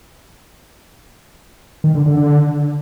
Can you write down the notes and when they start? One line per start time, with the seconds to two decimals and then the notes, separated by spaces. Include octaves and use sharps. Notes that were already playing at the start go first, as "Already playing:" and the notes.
1.84 D#3
1.95 D3
2.06 D3
2.17 D3